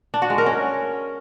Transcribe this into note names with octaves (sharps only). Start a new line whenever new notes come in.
D4
F#4
G#3
A#4
C#4